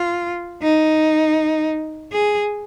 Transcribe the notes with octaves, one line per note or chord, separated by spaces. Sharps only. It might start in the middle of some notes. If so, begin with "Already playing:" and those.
Already playing: F4
D#4
G#4